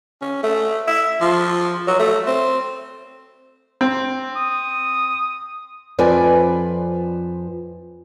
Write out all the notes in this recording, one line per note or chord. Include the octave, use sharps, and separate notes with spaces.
C#4
A3
E5
F3
F#3
A3
C4
C4
D#6
F2 F3 B4 D5 G#5